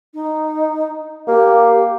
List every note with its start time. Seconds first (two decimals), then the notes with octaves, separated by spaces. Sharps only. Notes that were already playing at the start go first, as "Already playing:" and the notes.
0.14 D#4
1.28 A#3 G4